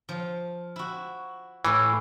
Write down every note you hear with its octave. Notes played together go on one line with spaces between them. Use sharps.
F3
E4 F#4
A2 E3 F5